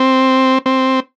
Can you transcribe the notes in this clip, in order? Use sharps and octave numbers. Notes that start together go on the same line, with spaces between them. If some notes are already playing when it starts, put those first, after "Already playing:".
Already playing: C4
C4